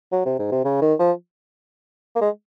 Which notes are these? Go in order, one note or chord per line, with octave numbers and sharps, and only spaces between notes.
F#3
C3
G#2
C3
C#3
D#3
F3
A#3
G#3